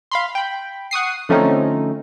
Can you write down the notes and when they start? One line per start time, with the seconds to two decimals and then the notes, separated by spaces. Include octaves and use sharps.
0.11 F5 B5 C6
0.35 G5 B5
0.91 F#5 C#6 D#6 C7
1.29 D3 F3 A3 C4 C#4 D#4